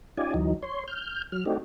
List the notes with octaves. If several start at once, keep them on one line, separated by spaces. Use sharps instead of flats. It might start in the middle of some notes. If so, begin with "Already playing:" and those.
C#4 D#4 F4 G4 D5 G#5
D2 E3 F#3 D#4
C#5 C6
F6 G6
F#3 F6
A3 C4 D4 D#4 F#4 G4